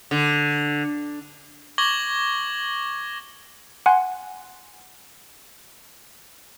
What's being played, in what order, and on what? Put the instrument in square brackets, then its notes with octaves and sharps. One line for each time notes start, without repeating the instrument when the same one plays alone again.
[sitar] D3
[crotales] C#6 D6 G#6 A#6 F#7 G7
[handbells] F#5 G#5 C6 F#6